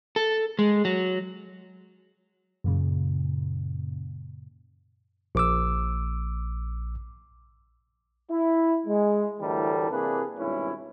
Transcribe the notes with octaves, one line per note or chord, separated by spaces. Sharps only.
A4
G#3
F#3
F#2 A#2 C#3
A#1 D6 E6
E4
G#3
D2 A2 E3 G3 A4 A#4
C3 E3 A#3 D4 G#4 B4
G#1 G2 B2 C#4 E4